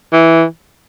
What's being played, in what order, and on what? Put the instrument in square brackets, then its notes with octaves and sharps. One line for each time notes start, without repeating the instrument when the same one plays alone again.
[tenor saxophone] E3